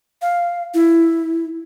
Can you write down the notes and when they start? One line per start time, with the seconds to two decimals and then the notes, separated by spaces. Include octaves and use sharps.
0.22 F5
0.74 E4